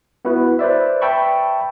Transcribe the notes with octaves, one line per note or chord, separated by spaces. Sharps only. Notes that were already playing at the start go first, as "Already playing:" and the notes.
B3 E4 F#4 B4
B4 C5 D5 E5
E5 G5 A5 B5 C#6